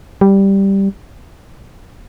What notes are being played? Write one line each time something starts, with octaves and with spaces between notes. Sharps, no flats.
G3